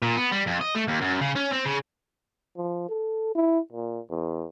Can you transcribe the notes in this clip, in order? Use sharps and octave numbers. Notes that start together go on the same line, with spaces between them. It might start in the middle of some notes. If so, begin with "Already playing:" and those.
A#2
B3
G3
F2
D#5
A3
D#2
F#2
C#3
C#4
C4
C#3
F3
A4
E4
A#2
E2